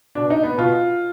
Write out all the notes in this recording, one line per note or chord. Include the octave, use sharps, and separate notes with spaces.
B2 D4
D#4
B3
B2 F4